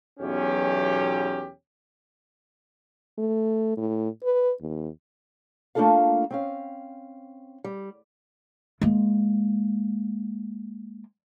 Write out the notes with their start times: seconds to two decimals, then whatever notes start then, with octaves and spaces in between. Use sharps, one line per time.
0.20 B1 E2 C#4 G4
3.18 A3
3.77 A2
4.24 B4
4.60 D#2
5.75 A3 A#3 D4 F4 A4 F5
6.31 C4 C#4 F5
7.64 G3
8.81 G#3 A#3